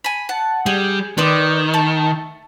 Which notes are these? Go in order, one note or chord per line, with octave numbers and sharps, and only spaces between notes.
G#5 B5
F#5 A5
G3 G#4
D#3 B4 D5 C6 D6 D#6
A3 A5